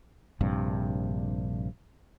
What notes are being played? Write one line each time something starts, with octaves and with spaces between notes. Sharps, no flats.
A#1 G2 C3